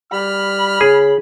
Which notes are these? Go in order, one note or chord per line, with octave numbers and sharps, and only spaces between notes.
G3 B5 F6
C#3 G#4